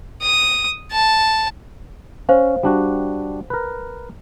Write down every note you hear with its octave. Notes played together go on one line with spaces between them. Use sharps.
D#6
A5
C#4 C5 F5
G3 D4 F#4
A#4 B4